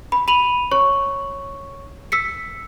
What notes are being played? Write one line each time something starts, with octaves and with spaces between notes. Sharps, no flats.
B5
B5 D#7 F7 F#7
C#5 C#6
E6 B6 C#7